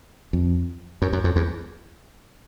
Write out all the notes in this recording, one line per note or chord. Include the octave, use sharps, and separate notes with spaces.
F2
F#2
F#2
F2
E2